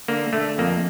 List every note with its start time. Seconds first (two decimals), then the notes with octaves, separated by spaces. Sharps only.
0.08 D3 A#3
0.33 D3 A3
0.58 F2 A#3